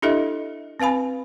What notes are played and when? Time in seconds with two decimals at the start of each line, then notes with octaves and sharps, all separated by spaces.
0.02 D4 E4 G4 A4 D#5 E5
0.80 C4 B4 F5 G#5 B5